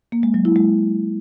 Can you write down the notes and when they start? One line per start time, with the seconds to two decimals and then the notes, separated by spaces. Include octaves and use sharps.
0.12 A#3
0.23 G#3
0.34 F#3
0.45 E4
0.56 G#3